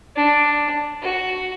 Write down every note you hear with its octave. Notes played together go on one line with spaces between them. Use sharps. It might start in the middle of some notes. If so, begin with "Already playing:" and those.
D4
F#4